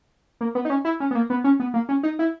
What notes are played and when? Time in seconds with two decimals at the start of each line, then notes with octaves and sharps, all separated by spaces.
0.41 A#3
0.55 B3
0.65 D#4
0.70 C#4
0.85 E4
1.00 C#4
1.11 B3
1.15 A#3
1.30 B3
1.44 C#4
1.60 B3
1.74 A#3
1.89 C#4
2.03 D#4
2.19 E4